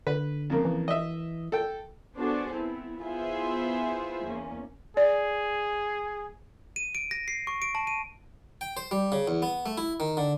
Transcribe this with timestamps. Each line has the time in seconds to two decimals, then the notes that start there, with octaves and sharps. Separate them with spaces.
0.07 D3 B4
0.50 F2 C#3 A#3
0.65 E3
0.88 D#5 E5
1.52 A4 G5
2.17 B3 D4 F#4 G#4 A4 C5
2.53 B3 C4 E4
3.02 B3 E4 F4 G#4 C5 E5
4.25 E2 A#3 C#4
4.97 G#4 D5
6.76 D#7
6.95 D7
7.11 A#6
7.28 C7
7.47 C#6
7.62 D7
7.75 A5
7.87 D#7
8.61 G5
8.77 C5
8.91 G3
9.12 C#3
9.28 E2
9.42 B3
9.66 A3
9.78 E4
10.00 D#3
10.17 D3